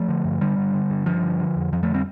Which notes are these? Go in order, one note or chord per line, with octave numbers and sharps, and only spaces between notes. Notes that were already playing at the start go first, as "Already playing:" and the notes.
Already playing: F3 A3
D3
G2
G2 D3 G3
D3
D3
G2
G2 F3
D3
D3
F2
F2 F3
F3 A3
D3
G3 C4